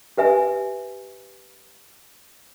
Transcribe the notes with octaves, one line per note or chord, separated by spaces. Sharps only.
G4 B4 E5 G#5